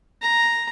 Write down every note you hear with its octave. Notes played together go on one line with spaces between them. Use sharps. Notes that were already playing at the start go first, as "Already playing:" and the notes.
A#5